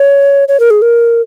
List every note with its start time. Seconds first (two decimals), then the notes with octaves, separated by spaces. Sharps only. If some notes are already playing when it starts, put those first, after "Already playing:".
Already playing: C#5
0.48 C#5
0.60 A#4
0.70 G#4
0.82 A#4